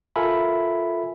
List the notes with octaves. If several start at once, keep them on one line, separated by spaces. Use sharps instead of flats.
F4 A4 A#4 E5 G#5 B5